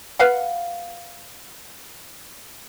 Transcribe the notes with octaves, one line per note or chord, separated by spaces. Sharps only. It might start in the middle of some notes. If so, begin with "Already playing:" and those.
B4 F5 F#5